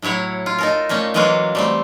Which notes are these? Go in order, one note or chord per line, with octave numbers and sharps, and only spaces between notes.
A2 F#3 E4 C#5 F#5
F4
D#4 A4 A#4
A#2 A3 A#3 C#4
E3 F#3 G#3 A#3 F4 F#4
G3 A3 C4